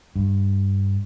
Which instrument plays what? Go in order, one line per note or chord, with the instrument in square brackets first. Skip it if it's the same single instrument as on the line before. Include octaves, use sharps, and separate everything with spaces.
[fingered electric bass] G2